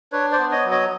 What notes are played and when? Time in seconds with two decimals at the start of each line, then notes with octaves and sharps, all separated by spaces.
0.12 D4 B4 C#5
0.32 C5 D5
0.38 B3
0.51 C#5 D#5
0.65 F#3
0.71 C#5 D#5